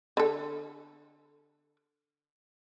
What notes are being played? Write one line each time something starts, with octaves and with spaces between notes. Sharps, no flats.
D3 A4